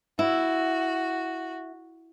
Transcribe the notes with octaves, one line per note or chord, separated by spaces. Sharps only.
E4 F#4